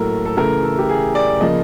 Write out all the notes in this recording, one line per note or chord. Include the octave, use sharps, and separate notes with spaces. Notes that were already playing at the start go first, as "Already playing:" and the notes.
Already playing: A2 F#3 A#3 A4 A#4
A4
C#3 E3 A3 A#4
A4
G4
G#4
D5
C#3 F3 A#3 D#5